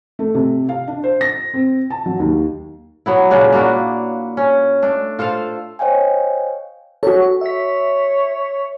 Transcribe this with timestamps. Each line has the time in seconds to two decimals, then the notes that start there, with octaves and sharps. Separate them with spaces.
0.19 A3
0.35 C3
0.69 F5
0.88 D4
1.04 C5
1.21 A#6
1.54 C4
1.90 A5
2.06 F#3
2.20 D#2
3.06 F#3 B3 E4
3.31 A#2 C#3 D4 F#4
3.52 A#3 D4 E4 F#4
4.37 C#4
4.82 A3 D4
5.19 F4 A4 C5 F5
5.79 C5 C#5 D#5 F5 G5 G#5
7.03 F#4 A4 C#5
7.41 C#5 E5 B6